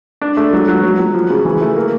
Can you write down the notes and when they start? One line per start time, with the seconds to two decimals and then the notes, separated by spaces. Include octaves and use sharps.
0.22 D4
0.37 A3
0.53 F#3
0.68 F#3
0.83 F#3
0.99 F#3
1.14 F3
1.30 C#3
1.45 E3
1.61 A3
1.76 A#3